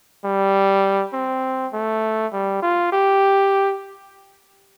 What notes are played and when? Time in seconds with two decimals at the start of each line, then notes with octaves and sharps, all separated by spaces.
0.24 G3
1.13 C4
1.73 A3
2.33 G3
2.62 F4
2.92 G4